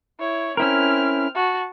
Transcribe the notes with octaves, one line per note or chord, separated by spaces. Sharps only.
E4 C#5
C4 C#4 E4 A#4 F6
F#4 A5